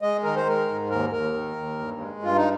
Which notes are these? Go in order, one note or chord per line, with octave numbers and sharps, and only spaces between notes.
G#3 D#5
D#3 A#4
C5
G#3 A#4
G#2
D#2 A#4
D#2 A#4
D#3
D#2
G2
G#3
G2 F4
D#4